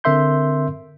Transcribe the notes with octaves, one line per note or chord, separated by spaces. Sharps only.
D3 C4 A#4 E5 C6 G6